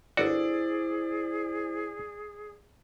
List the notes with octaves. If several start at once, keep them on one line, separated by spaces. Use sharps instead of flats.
G1 E4 F#4 G#4 C5 D5